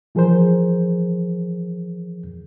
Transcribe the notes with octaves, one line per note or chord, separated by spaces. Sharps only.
E3 F3 G#4 A#4 C5